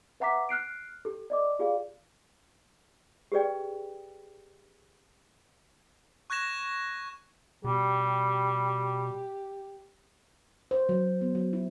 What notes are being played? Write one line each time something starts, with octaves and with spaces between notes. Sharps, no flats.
B4 E5 F#5 A#5 D6 B6
F6 F#6 C7 D7
G4 A4
D5 D#5 D6
F4 G4 G#4 D5 F5
G4 G#4 B4 D5 G5
C#6 F#6 G#6 A#6 E7
B2 G3 G4
C5
F#3
B3
F#3
E4